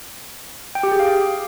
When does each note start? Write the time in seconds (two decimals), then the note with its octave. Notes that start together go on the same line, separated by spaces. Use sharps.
0.75 G5
0.83 G4
0.91 G#4
1.00 F5